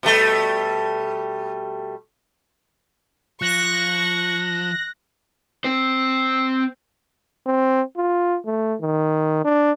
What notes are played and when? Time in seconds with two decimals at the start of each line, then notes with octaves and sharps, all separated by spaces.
0.03 B2 G3 A3
3.42 F3 C#6 F#6 A#6
5.64 C4 C5
7.46 C4
7.97 F4
8.46 A3
8.81 D#3
9.45 D4